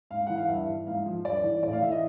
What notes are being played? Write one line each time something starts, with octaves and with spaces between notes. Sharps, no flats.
G#2 F5
E3 F#5
F5
G2 E5
E3
G#2 F5
F3
G2 D5
E3
A2 D5
F5
E3 E5
D#5